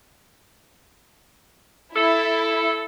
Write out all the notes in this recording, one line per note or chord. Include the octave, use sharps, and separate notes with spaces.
E4 A4